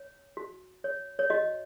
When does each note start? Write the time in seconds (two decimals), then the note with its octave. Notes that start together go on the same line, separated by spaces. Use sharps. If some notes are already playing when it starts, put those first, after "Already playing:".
Already playing: C#5
0.37 F#4
0.84 C#5
1.19 C#5
1.30 F#4 D#5